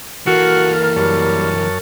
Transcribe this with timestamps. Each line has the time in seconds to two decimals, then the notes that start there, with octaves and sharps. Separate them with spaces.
0.27 E3 A#3 F#4 A4 A#4 F6
0.96 F#2 G3 C#5 A5